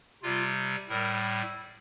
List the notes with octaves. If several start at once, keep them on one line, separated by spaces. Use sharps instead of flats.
C3 G3 F4
A2 G3 A#4